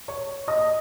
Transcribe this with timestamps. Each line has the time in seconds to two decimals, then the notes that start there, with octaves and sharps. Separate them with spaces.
0.08 C#5 C#6
0.48 D#5 D#6